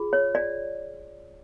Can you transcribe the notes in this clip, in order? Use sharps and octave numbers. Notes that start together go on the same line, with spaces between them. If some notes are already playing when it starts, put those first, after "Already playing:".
Already playing: F4 G#4
C#5
D5